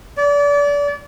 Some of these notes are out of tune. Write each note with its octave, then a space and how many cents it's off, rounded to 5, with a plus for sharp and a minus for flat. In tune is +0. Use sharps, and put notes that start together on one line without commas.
D5 -30